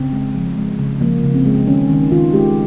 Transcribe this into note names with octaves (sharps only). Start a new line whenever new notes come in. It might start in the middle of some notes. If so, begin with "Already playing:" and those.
Already playing: C#3 C4
G#3
F3
G#3
C#3
F3 A#3
C#3
C4
G#3
D#3 C#4
D#3
D#3 F4
G#3 G4